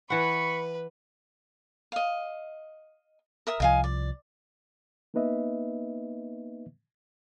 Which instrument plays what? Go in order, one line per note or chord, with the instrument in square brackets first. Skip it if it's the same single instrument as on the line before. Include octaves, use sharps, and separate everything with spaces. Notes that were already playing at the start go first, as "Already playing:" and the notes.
[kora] E3 F#5 [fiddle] B4 [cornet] B5 [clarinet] C#6
[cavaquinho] D#5 F5
A#4 E5 D#6
[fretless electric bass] C2 F3 [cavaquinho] D#5 F5 G#5
[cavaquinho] D5
[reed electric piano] A#3 B3 D#4 B4 D#5 E5